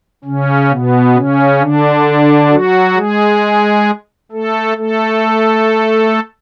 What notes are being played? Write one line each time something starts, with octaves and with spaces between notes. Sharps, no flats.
C#3 C#4
B2 B3
C#3 C#4
D3 D4
F#3 F#4
G#3 G#4
A3 A4
A3 A4